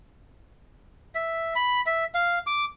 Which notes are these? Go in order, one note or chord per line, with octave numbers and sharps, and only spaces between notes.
E5
B5
E5
F5
D6